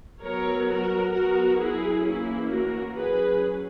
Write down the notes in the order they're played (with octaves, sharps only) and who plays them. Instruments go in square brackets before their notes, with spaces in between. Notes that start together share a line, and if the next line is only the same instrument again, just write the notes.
[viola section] F#3 B3 A#4 C#5
F#4 A#4
F#3 B3 F#4 A#4
E4 G#4
E3 A#3 C#4 E4
F#4 A#4
F#3 C#4 G#4 B4